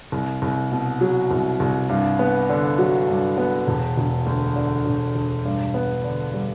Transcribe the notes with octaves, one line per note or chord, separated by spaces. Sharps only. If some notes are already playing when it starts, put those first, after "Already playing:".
C2
C2
B2
F#3
C2
C2
G2
B3
D3
F#3
G2
B3
E1
E1
D2
D3
E1
E1
G2
B3
D3
G3